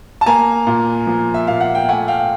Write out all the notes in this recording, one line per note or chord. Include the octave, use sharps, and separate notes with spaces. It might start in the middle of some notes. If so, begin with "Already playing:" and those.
A5
A#3 G#5 A#5
A#2
F3
E5
A#2 F5
F#5
G5
A3 F#5 G#5
F5 G5
F5